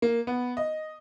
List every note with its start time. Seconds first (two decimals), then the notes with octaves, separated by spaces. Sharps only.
0.02 A#3
0.27 B3
0.57 D#5